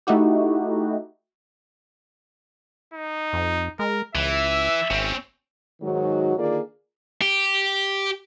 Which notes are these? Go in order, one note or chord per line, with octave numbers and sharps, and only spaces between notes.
A3 D#4 E4 F#4 G4
D#4
F2
G#3 A#4
C#2 E3 E5
G#1 C4 C#4
G#2 D#3 F#3 G#3 F#4
D3 D#3 A#3 F4 G#4 D5
G4